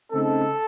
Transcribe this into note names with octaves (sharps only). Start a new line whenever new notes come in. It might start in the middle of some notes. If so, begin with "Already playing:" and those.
C#3 A3 C4 D#4 A4